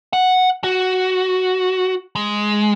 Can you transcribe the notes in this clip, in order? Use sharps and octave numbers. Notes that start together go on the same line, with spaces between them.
F#5
F#4
G#3